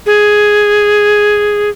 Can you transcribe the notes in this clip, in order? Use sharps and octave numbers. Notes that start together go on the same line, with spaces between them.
G#4